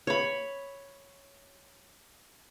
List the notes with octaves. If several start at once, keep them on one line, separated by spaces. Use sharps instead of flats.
C#5 B5